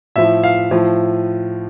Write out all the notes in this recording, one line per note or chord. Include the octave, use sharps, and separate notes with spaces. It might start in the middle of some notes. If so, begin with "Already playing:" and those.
A2 F3 E5
F5
A2 F3